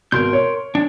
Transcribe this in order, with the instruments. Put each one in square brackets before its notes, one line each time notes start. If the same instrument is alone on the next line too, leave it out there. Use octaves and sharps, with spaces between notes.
[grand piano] G#1 B2 [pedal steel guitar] A#4 C6 G6
[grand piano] C#5
[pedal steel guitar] G#3 D4